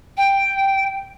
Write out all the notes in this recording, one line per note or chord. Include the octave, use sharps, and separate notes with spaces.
G5